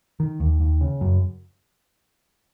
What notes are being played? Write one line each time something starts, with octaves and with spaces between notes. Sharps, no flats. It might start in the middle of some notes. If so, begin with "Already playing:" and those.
D#3
D#2
D#2
C#3
F#2